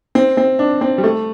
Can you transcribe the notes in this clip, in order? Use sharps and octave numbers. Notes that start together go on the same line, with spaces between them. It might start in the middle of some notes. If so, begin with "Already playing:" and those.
C4
C4
D4
C4
G3
A3